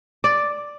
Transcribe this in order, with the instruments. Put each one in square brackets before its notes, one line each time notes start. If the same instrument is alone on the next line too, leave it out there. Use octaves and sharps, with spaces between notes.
[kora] D5